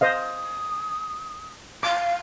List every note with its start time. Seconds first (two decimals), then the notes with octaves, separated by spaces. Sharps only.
0.01 C5 D#5 F5 D#6
1.83 F5 D6